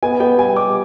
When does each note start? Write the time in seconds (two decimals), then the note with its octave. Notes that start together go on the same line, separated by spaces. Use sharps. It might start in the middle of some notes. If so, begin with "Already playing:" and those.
0.03 B3 G#5
0.20 B3 G5
0.38 G3 G#5
0.56 G3 D6